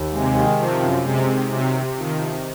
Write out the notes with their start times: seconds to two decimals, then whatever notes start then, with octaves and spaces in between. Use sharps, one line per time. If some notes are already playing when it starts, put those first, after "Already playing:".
Already playing: D#2
0.13 C3 G#3
0.36 D#3
0.59 C3 F3
0.82 F#2
1.05 C3 G#3
1.27 D#3
1.51 C3 F#3
1.73 C3
1.96 D#3 F3
2.19 C3